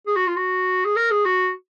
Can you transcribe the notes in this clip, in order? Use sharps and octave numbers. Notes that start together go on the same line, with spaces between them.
G#4
F#4
F4
F#4
G#4
A#4
G#4
F#4